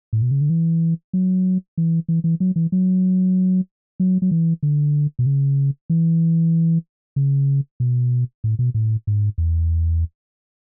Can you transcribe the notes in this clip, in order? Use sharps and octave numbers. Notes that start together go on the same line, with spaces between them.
A2
B2
C#3
D3
E3
F#3
E3
E3
E3
F#3
E3
F#3
F#3
F#3
E3
D3
B2
C#3
E3
C#3
B2
A2
B2
A2
G#2
E2